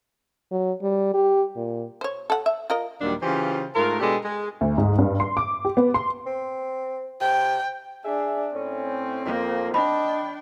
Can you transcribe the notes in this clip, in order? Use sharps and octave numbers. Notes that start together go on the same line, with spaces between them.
F#3
G3
G4
A#2
C5 C#5
A4 F#5
E5
F4 A#4 D#5
D#2 A#2 D#3 F#3 G3 D4
C#3 E3 F4 G4 C5
G#2 A3 F4 A#4
B2 G#3 D4 G4 A4
G#3
D2
G#2
G2
C6
D6
G4
B3
C6
C4
C3 G5
D4 G#4 E5
A2 C4 C#4
F2 A#3
D4 D#5 G5 A5 B5